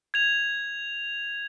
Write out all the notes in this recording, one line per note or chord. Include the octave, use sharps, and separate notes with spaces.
G#6 F7